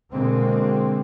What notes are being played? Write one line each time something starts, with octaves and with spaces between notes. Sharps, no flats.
B2 D3 G#3 A#3 C4